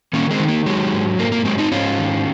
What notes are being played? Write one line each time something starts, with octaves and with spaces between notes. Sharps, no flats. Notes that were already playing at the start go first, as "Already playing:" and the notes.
D#3 A#3 C#4
G#3 C4
D#3
A#3
F#3 G#3
G#2
G#2 A#3
A#3
F#3 G#3 C4
C4 D#4
G#2 C#4 F4
D#3